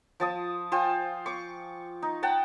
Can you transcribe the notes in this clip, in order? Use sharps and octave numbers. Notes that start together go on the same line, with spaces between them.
F3 A5 D#6
F4 C5 G5 G#5
C#6 D6
D#4
F#5 G5 A5